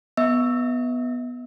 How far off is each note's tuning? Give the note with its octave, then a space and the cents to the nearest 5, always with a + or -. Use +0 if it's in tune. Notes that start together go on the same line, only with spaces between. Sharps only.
B3 +0 E5 -40